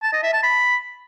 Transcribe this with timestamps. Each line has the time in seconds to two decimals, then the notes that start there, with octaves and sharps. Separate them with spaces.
0.03 A5
0.13 D#5
0.23 E5
0.33 A5
0.43 B5